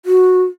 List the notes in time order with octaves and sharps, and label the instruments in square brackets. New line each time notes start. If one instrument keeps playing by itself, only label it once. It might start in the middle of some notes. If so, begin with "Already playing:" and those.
[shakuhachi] F#4